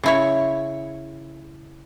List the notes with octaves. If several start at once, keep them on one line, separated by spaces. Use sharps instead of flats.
C#3 E4 C#5